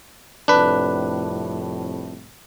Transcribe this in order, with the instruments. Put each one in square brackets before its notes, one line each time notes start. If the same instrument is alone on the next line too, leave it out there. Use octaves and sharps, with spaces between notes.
[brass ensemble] C2 F2 A2 [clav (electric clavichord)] D4 B4